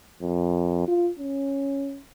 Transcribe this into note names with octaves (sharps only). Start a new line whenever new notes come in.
F2
F4
C#4